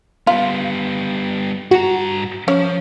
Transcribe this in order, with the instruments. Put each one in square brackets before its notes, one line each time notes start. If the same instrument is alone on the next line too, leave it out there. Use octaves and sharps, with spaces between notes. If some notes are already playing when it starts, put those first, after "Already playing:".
[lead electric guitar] G3 B3 [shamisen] F4
[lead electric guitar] G2 A#5 [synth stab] F#4
[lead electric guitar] F3 [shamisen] C#4 C#5